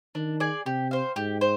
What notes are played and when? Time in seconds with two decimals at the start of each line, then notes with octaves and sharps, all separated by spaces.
0.15 D#3 D4
0.40 G#4 D5
0.66 C3 G4
0.91 C5 F5
1.16 G#2 G4
1.41 C5